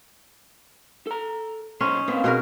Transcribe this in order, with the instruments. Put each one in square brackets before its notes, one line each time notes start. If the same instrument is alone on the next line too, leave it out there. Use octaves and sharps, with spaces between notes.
[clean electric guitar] A4 A#5
[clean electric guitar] F#2 A#2 C5 [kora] C#4 D#4
[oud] A#3 [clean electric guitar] C4 B4 C5
[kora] B2 A#4 [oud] D4 D#4 G#4